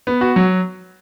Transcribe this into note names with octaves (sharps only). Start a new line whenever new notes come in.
B3
F#4
F#3